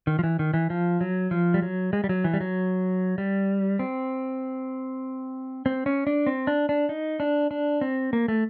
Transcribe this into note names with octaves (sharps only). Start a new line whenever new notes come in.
D#3
F3
E3
D#3
E3
F3
F#3
F3
G3
F#3
G#3
G3
F#3
E3
G3
F#3
G3
C4
C4
C#4
D4
C4
D4
D4
D#4
D4
D4
C4
A#3
A3